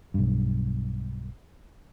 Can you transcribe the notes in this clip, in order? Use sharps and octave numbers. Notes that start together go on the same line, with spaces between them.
B1 G2